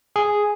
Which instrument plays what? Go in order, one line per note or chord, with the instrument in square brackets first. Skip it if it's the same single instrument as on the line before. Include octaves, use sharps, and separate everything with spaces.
[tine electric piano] G#4